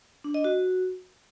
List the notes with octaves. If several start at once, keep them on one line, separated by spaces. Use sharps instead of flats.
D4
D#5
F#4